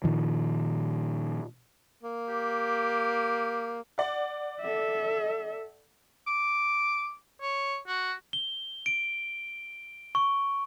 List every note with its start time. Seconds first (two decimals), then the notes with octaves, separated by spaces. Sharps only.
0.04 A#2 D#3 F3
2.03 A#3
2.29 G4
3.98 D5 F#5
4.61 A4 E5
6.27 D6
7.41 C#5
7.87 F#4
8.33 G7
8.86 D7
10.15 C#6